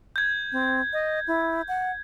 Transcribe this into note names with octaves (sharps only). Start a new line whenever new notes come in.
G6 G#6
C4
D#5
E4
F#5